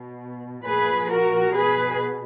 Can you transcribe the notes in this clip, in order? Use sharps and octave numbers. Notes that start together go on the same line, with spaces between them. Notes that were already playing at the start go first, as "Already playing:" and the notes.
Already playing: B2
A#2 F3 G#4 B4
F#4 A#4
B2 G#4 B4